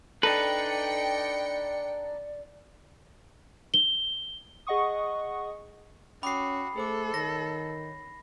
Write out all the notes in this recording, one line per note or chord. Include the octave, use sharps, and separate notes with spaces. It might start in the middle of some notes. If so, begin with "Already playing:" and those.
D4 D#4 A4 B4 D5 G5 C#7
G7
G#4 D#5 F#5 C#6 D#6
C#4 F#4 G5 B5 D6 D#6 C7
A3 G#4 A4 C5 D6
D#3 C#5 A#6